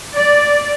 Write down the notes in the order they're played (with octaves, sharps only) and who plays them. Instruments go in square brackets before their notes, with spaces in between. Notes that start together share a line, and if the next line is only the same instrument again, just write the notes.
[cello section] D5